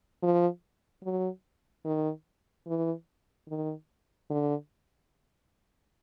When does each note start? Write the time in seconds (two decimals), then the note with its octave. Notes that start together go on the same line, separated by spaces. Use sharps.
0.23 F3
1.04 F#3
1.85 D#3
2.67 E3
3.49 D#3
4.30 D3